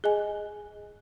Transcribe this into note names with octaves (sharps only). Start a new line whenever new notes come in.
G#4 D#5 G#5